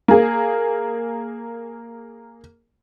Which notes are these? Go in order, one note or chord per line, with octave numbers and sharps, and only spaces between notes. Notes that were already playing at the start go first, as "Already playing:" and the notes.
A#3 G#4